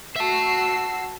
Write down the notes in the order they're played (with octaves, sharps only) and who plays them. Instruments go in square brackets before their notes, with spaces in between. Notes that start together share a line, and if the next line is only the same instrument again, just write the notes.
[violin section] F#4 E6 C7 [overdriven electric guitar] E5 A5